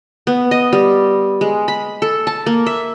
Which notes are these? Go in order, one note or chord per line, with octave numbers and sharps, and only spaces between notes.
B3
D#5
G3
G#3
B5
A4
A5
A#3
E5